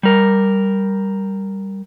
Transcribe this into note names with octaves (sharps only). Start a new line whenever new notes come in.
G3 A#4